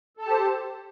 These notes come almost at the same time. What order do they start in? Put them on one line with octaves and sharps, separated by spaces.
A4 A5 G4 C5